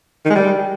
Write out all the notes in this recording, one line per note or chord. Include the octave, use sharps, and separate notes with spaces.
D#3
G#3
G3